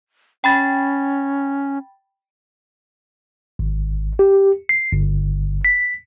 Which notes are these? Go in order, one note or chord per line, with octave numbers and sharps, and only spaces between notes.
C#4 G5 B5 A6
G#1
G4
C7
G1
B6